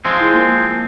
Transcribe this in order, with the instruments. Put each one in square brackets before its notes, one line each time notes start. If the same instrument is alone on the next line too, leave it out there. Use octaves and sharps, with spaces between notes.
[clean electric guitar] F3 G#3 C4
[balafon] E4 G#4
A#3 E4 A#4
A5